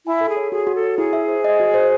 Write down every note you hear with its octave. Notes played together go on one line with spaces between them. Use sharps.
E4 G#5
A4
G#4
C#5
F#4 G#4
F#4
A4
C#5
E4 G#4
E5
C5
D#5
F#4
C5